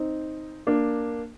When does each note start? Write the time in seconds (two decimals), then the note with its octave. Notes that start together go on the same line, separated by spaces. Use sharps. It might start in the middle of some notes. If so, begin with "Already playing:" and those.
Already playing: C4 D#4
0.67 A#3 D4